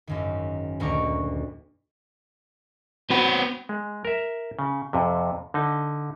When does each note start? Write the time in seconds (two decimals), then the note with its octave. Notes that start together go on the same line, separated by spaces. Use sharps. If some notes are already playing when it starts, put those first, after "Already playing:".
0.07 G#1 F#2 D#3
0.80 D#1 D2 D#3 A#4 C#6 D6
3.10 B3 C4 F#4 B4
3.69 G#3
4.05 A#4 E5
4.59 C#3
4.93 F2 C3
5.54 D3 D#4